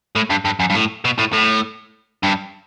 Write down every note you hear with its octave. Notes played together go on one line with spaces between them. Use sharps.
A2
G2
G2
F#2
G2
A2
B2
A2
A2
G2